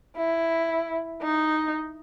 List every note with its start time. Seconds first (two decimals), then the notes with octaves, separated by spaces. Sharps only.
0.17 E4
1.22 D#4